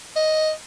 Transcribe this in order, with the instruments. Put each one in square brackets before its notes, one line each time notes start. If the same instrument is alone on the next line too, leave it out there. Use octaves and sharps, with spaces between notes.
[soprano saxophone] D#5